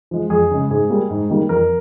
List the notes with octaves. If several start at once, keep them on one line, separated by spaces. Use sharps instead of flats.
F3 G#3
F2 G#4
C#3 G#3
G#2 G#4
G3 A#3
G#2
D#3 G3 A#3
F2 A#4